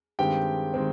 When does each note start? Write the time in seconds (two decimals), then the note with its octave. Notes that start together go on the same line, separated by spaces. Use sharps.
0.19 G2 D#3 G#3 C4 G4 G5
0.74 D#3 G#3 C4